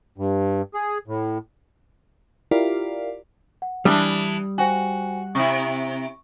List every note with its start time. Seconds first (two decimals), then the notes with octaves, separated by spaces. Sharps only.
0.18 G2
0.74 G#4
1.08 A2
2.51 E4 F4 G4 A#4 D5 F5
3.62 F#5
3.85 E3 G3 D4 D#6
4.58 F#4 C5 G5 G#5
5.35 C3 E4 C#6